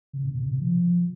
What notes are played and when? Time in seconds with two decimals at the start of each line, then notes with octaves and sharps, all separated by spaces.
0.13 C#3
0.25 A#2
0.37 C3
0.49 C3
0.61 F3